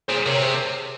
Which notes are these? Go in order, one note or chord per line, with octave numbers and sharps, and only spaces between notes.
A#2 G#4 C5
C3 A#4 C#5
G#4 C5